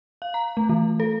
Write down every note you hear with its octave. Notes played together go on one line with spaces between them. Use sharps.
F5
A#5
A3
E3
A4